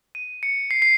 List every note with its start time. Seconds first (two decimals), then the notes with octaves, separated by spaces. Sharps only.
0.15 D#7
0.43 C#7
0.71 C7
0.82 C7